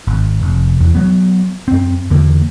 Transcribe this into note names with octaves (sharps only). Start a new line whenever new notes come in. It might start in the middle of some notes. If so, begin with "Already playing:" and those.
G#1
F1
E2
F#3 B3
F#2 C4
E2 D3 A#3